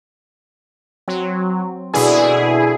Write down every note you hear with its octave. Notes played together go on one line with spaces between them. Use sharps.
F#3 C4
B2 D3 E3 E4 G#4